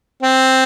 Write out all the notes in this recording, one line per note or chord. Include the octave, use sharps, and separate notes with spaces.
C4